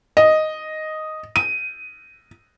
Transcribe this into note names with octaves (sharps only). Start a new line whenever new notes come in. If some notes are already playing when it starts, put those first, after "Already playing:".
D#5
D#7